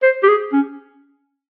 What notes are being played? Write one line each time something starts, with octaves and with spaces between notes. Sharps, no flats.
C5
G4
G#4
C#4